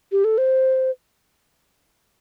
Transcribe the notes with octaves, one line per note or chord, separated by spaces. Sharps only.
G4
A4
C5